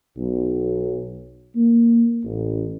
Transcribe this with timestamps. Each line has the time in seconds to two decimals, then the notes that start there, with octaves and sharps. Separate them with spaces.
0.17 B1
1.56 A#3
2.25 A1